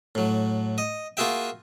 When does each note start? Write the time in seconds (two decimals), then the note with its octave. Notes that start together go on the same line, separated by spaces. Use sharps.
0.15 A2 F#3
0.78 D#5
1.17 A#3 F4 F#4 G#4 E5 G5